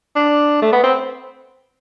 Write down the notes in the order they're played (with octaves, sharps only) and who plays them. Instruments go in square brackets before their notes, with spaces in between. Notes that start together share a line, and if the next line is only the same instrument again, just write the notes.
[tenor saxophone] D4
A3
B3
C4